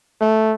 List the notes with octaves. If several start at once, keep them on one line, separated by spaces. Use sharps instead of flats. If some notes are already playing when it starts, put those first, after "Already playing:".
A3